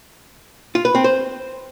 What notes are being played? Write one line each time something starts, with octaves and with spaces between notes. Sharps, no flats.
F4
B4
C4
C5